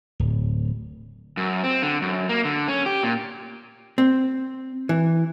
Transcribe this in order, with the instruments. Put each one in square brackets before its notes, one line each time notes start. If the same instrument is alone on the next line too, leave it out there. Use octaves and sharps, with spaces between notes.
[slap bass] D1
[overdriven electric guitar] F#2
C4
D3
F#2
A#3
D3
C#4
G4
A#2
[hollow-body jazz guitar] C4
E3